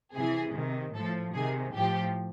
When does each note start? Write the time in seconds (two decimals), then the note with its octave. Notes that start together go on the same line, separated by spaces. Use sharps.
0.15 C3 E3 G#4
0.55 C3 D#3
0.94 A2 F3 A4
1.34 C3 D#3 G#4
1.74 A2 F3 G4